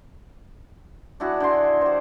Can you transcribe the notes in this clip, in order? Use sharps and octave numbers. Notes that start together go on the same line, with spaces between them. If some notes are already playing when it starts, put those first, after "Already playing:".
D4 E4 F#4 G#4
D3 D5 C6
G4 C5